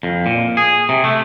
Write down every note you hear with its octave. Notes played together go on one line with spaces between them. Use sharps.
F2
A#2
G#4
C3
A3